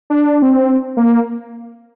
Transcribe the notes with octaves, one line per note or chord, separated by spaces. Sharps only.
D4
C4
A#3